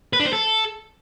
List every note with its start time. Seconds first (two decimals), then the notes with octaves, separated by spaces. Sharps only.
0.13 B4
0.20 D4
0.26 C5
0.33 A4